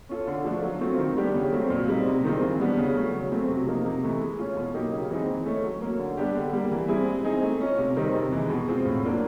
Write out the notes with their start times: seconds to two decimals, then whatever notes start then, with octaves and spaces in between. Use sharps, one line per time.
0.09 C#4 F4 A4
0.27 D3
0.45 F3 A3 D4 F#4
0.63 F#3
0.81 A3 C4 F4
0.99 D#3
1.17 G3 B3 D4 G4
1.34 C#3
1.53 F#3 A3 C4
1.70 A#2
1.88 G3 C4 D#4
2.06 C3
2.24 D#3 G#3 C4 F4
2.42 E3
2.60 G3 B3 D4
2.78 C#3
2.95 F#3 A3
3.13 C#3
3.31 F#3 A3 C4
3.49 C3
3.67 F3 A#3 D#4
3.85 C3
4.03 E3 A3
4.20 G#3
4.39 C#4 F4
4.57 B2
4.74 F#3 A#3 D#4 G4
4.92 C#3
5.10 E3 G#3 C4 D#4
5.28 E3
5.46 A3 C#4
5.64 F#3
5.81 A#3 C#4
5.99 D3
6.17 G3 B3 D4 G4
6.35 D3
6.53 G3 A#3
6.71 E3
6.88 G3 C4 E4 G#4
7.07 G#3
7.24 C4 D#4 G#4
7.42 A3
7.60 C#4 F4
7.78 C3
7.97 D#3 G3 C4 D#4
8.14 C3
8.32 E3 G#3
8.50 B2
8.68 G#3 C4 F4
8.85 A2
9.04 F#3 A#3 D4 F4